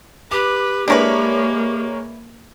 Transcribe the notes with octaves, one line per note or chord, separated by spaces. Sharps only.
G4 B4 D6
G#3 A#3 D4 E4 A#4 B4 C#5